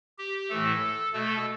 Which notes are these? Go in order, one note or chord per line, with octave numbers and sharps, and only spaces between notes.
G4
A2 E3 A3 A4
B2 A3 A4